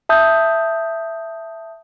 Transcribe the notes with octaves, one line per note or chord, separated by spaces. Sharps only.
E5 A5 D#6 G6